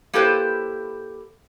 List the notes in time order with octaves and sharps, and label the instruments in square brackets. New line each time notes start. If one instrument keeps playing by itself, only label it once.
[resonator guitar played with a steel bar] A#3 E4 G4 A4 B4 C5